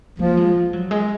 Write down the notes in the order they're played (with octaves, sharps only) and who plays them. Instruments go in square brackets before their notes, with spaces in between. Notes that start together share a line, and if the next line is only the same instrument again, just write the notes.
[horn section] F3 [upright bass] A#3
[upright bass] G#3
G#3
F#3
G#3